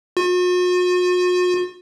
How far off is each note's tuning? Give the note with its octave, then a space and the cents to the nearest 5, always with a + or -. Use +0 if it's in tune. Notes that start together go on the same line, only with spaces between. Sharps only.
F#4 -45